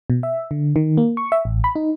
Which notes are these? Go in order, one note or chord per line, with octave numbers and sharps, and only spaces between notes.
B2
E5
D3
D#3
A#3
C#6
E5
A1
B5
D#4